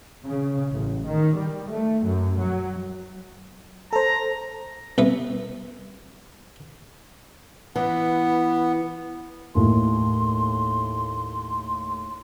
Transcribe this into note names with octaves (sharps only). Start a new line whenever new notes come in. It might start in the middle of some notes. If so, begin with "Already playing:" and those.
C#3
A1
D#3
G3
A3
F#2
F#3
A4 C5 A#5
C2 B3 E5
E3 B3
D#2 A2 C6